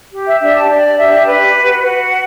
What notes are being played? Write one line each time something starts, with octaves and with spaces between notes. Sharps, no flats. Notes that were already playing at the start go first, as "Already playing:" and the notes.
G4
E5
D4 E5
A5
D4 D5
G4 E5
B4
F#4
F#4